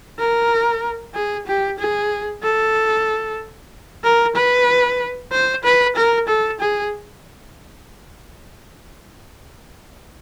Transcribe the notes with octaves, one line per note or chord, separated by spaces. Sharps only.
A#4
G#4
G4
G#4
A4
A#4
B4
C5
B4
A#4
A4
G#4